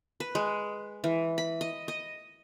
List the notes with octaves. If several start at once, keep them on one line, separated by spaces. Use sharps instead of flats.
B4
G#3
E3
B5
D#5
D#5